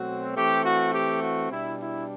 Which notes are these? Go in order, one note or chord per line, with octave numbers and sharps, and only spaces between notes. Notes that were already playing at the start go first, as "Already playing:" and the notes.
Already playing: B2 F#3 A3 C4 F#4
E3 A3 C4 G4
F#4
G4
F#4
B2 G3 D4 E4
E4